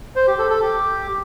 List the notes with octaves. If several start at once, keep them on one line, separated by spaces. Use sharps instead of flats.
C5
G4
A4
A4
G4